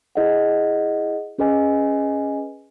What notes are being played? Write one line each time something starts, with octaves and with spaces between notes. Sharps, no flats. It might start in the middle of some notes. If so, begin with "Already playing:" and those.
E4 G#4 D#5 F#5
C#4 G#4 B4 D#5 G#5